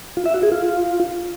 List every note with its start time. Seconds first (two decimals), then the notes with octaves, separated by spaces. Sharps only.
0.17 F4
0.26 E5
0.34 F#4
0.43 G#4
0.52 F4